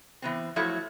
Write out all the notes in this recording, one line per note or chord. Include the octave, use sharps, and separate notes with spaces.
E3 B3 C4
F3 F#3 A3 E4 C#5